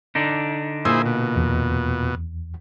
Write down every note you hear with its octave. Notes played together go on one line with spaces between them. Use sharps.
D3 D4 D#4
A#2 E4 G#4 C5
B2
E2